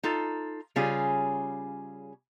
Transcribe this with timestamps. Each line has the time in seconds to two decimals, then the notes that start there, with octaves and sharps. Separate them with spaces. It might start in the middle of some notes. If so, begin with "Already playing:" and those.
0.03 D#4 F4 A4
0.76 C#3 G3 C#4 F4 G#4